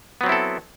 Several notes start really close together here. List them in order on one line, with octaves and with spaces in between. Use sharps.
B3 F#3 C4 E4 A4